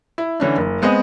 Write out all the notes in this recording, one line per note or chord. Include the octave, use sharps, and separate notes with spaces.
E4
D3 E3 C#4 D4
F#1
G#3 B3 C4 G#4 D#5